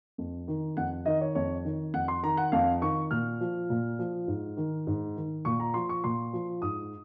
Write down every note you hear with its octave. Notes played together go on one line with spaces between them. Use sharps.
F2
D#3
F2 F#5
D#3 D#5
C#5
F2 C#5
D#3
F2 F#5
C6
D#3 A#5
F#5
F2 F5
D#3 C#6
A#2 F6
F3
A#2
F3
G#2
D#3
G#2
D#3
A#2 C#6
A#5
F3 C6
C#6
A#2 C6
F3
G#2 D#6